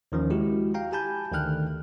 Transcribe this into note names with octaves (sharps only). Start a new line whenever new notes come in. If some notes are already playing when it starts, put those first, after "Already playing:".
D#2 D#3 F3 C#4
G#3 E4 F#4 G4
F5 G5 A#5
G4 G#5 A5 B5 G6
D2 D3 D#3 G5 F6 F#6